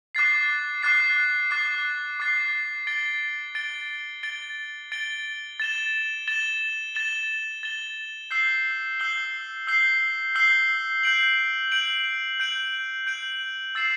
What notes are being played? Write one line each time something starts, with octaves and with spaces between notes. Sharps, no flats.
D6 F#6 A6 C7
D6 F#6 A6 C7
D6 F#6 A6 C7
D6 F#6 A6 C7
A6 D7 G7
A6 D7 G7
A6 D7 G7
A6 D7 G7
A6 E7 G7
A6 E7 G7
A6 E7 G7
A6 E7 G7
E6 G6 C7 G7
E6 G6 C7 G7
E6 G6 C7 G7
E6 G6 C7 G7
G6 D7 F#7
G6 D7 F#7
G6 D7 F#7
G6 D7 F#7
E6 A6 C7 E7